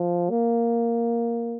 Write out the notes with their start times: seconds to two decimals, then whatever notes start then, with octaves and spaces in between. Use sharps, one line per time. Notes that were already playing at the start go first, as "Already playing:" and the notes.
Already playing: F3
0.30 A#3